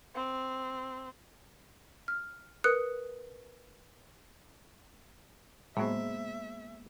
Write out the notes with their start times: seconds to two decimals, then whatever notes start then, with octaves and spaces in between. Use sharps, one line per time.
0.15 C4
2.08 F6
2.64 A#4 B4 D#6 F#6 C#7
5.77 A2 F#3 G#3 A#3 B3 C5 E5